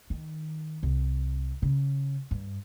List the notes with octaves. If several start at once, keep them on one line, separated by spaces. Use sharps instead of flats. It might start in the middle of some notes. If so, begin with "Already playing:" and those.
D#3
C2
C#3
G2